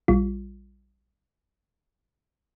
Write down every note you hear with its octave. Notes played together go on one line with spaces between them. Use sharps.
A#1 G3 F4